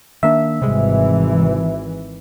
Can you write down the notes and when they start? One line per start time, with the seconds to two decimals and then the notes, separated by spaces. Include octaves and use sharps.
0.23 D#3 A#3 D4 E5
0.62 G#1 C3 E3 G3 G#3